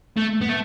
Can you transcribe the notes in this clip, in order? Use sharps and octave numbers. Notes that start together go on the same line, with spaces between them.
A3
B3
A3